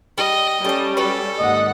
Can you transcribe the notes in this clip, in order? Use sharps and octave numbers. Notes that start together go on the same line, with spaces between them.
G3 D#5
G3 A3 C#4 A5
F#4 A4 B4 D5
G#1 D#2 D#5 F#5